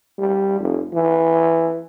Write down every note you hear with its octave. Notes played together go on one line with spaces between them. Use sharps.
G3
F1
E3